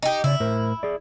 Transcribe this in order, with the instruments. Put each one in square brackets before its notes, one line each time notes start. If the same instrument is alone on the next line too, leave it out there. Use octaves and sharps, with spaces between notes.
[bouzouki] D#4 G4
[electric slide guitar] C#3 D5 [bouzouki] E4
[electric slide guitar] A2 A#4 C5
G#4 D5